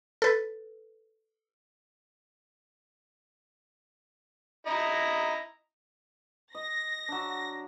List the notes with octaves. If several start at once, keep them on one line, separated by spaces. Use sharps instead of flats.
A4 B4
E4 D#5 A#5
D#5 A#6
F#3 D4